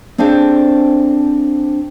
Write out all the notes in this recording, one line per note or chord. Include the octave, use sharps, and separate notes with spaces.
C4 D4 G#4 A4 C5 F5